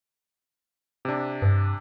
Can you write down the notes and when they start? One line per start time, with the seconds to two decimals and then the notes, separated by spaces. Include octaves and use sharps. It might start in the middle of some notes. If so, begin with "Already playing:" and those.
1.05 C3 D4
1.42 G2